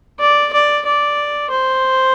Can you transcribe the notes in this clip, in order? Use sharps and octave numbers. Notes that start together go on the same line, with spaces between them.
D5
D5
D5
C5